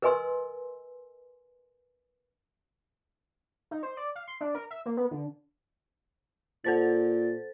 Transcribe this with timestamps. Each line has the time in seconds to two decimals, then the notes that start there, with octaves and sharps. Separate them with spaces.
0.02 A#4 B4 D#5 G#5 C6 E6
3.71 D#4
3.83 C5
3.97 D5
4.15 F5
4.27 C6
4.41 D4
4.55 A#4
4.71 E5
4.86 A#3
4.97 B3
5.11 D3
6.64 A#2 A4 C5 A6